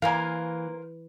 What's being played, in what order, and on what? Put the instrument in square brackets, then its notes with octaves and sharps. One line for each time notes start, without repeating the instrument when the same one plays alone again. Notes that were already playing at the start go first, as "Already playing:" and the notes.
[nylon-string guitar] E3 [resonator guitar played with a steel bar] A#3 F5 [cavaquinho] A#4 C5 G#5